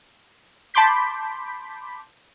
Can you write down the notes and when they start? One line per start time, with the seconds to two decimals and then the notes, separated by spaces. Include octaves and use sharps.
0.74 A5 B5 C6 D6 G6 B6